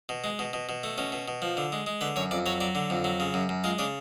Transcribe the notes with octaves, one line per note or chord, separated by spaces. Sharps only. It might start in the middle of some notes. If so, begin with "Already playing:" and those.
B2
G#3
B2
B2
B2
A3
B2 C#4
B2
B2
F3
D3
G#3
G#3
D3 B4
F#2 C#5
F2 D5
F#3 C#5
F#3 D5
D3
F2
F#3
C#3
F#2
F#2
G#3 F4
C#3 D4